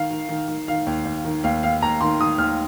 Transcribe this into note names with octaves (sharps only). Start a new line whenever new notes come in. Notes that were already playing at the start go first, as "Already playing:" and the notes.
Already playing: D#3 F5
D#3
D#3
D#3
D#3 F5
D#2
D#2
D#3
D#2 F5
D#2 F5
D#2 A#5
D#3 C6
D#3 D#6
D#2 F6